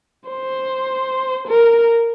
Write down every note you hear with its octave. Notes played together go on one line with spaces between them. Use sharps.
C5
A#4